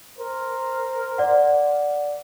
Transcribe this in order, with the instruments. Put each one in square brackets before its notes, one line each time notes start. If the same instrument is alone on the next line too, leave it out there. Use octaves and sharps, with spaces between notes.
[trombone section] A#4 C5
[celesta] D5 F#5